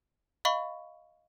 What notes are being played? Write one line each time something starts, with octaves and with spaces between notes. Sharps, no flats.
D#5 F5 B5 C#6